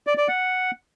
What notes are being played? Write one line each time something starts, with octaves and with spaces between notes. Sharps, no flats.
D5
D5
F#5